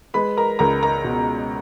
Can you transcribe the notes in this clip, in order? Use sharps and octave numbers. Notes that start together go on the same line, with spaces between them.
G#3 B4 B5
A#4 A#5
C#2 A#4 A#5
A#4 A#5
B2